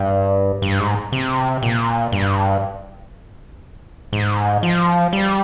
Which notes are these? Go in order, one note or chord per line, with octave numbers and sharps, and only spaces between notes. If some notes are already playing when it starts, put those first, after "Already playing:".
Already playing: G2
G2
G#2
C3
A#2
G2
G#2
F3
G3